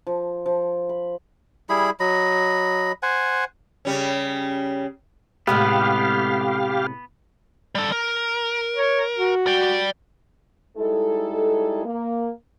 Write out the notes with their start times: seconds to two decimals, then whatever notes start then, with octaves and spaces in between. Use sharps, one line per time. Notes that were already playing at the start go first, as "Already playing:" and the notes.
0.07 F3
0.46 F3
0.89 B5
1.69 G3 E4 G#4 B5
2.00 F#3 D#5 B5
3.03 C5 F#5 G#5
3.85 C#3 G3 C#4
5.47 A2 C3 G#3 B3 G4 F5
7.75 G3 A4
7.92 A#4
8.75 C#5
9.18 F#4
9.47 D5 G5
10.78 G3 G#3 D#4 E4 A4
11.85 A#3